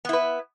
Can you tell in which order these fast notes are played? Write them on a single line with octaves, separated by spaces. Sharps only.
B3 E4 B4